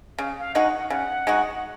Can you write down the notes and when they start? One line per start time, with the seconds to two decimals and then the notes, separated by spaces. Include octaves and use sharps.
0.18 C#3 F5
0.39 F5
0.55 G#3 D#4 F#4 F#5
0.90 C#3 F#5
1.27 G#3 D#4 F#4